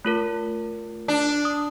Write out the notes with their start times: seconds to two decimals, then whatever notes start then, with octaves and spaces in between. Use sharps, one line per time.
0.05 A3 F4 A#4
1.08 D4
1.45 D#6